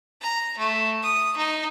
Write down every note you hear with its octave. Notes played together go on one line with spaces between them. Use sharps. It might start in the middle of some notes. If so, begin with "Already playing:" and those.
A#5
A3
D#6
D#4